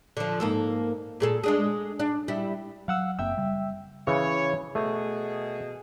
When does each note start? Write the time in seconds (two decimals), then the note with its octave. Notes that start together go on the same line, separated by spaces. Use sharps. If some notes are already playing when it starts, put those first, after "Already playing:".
0.17 D3 F3
0.40 G#2 A#3 A4
1.20 A#2 G#4 A4
1.43 G#3 D4 G#4
2.00 D4
2.28 G3 E4
2.88 F#3 F5 F#5 E6
3.19 F#1 A#3 C4 E5 G5 E6
3.37 C#3 G3
4.07 C#3 E3 C#5
4.75 B2 A3 G#4